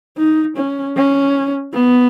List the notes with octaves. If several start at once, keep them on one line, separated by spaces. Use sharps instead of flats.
D#4
C#4
C#4
B3